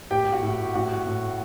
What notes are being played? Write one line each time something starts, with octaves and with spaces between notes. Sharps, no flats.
A2 G4 G5
F#4 F#5
A2
A2 F#4 F#5
A2